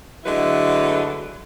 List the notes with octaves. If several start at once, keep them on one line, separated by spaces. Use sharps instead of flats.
D3 F#3 G#3 A3 E4 B4